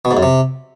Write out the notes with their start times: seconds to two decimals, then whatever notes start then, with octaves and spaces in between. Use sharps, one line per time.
0.05 B2
0.11 G#2
0.17 F#2
0.23 C3